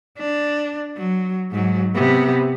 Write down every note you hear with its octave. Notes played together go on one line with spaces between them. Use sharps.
D4
F#3
G#2 F#3
C3 B3